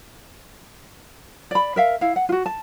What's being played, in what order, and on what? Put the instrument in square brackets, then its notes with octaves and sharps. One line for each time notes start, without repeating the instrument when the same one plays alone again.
[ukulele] D5 B5
A#4 E5 F5
E4 F5
F#5
F4 F#4
A5